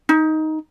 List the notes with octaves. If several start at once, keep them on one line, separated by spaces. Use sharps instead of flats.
D#4